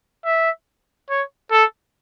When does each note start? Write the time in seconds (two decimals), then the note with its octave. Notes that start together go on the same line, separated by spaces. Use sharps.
0.25 E5
1.10 C#5
1.51 A4